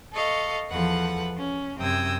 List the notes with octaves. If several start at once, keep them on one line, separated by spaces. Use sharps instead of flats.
A4 D#5 F5 C#6
E2 F3 A4 B4 F#5
C#4
F#2 C3 G5 D#6 E6 G#6